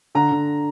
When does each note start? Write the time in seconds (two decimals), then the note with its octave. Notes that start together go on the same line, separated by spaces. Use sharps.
0.15 D3 A#5
0.32 D3